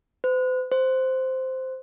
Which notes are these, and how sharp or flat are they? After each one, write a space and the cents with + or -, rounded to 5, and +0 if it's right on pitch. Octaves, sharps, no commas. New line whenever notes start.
C5 -45
C5 -5